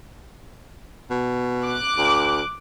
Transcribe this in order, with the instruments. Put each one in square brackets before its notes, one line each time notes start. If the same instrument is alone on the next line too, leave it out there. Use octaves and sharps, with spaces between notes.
[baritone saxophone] B2
[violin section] D6 F#6
[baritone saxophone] D2